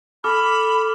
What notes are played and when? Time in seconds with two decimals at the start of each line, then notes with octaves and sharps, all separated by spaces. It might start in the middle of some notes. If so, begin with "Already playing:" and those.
0.24 A4 B5 D6 F6